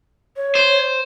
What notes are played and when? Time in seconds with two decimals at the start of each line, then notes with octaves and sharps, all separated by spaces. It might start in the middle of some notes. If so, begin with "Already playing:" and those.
0.36 C#5
0.55 C5